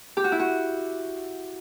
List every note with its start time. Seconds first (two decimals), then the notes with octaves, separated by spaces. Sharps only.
0.17 G4
0.24 F#4
0.32 E4
0.39 F#4